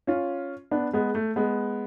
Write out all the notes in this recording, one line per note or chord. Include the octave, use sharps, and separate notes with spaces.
C#4 F4
B3 D4
G#3 B3
A3
G#3 B3